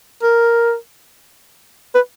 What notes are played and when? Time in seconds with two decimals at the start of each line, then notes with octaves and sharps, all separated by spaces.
0.23 A#4
1.94 B4